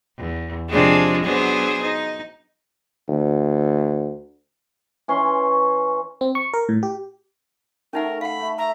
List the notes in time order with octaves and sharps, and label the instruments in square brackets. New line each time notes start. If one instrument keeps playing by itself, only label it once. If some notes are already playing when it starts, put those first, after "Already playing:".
[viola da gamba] E2
[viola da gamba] C3 F3 G#4 [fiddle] G#3 D4
[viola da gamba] F#3 B3 D4 [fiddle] G#4 C5
[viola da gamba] D#4
[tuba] D2
[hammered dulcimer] E3 C#4 E5 C6
[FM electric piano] C4
C#6
A#4
A2
G4
[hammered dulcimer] A3 [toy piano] C#4 D#4 F#5 [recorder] A#4
[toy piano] F5 F#5 [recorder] B5
[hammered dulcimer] A3
[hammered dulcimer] E5 [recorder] A#5